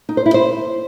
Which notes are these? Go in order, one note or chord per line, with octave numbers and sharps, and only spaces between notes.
D#4
C5
E4
C5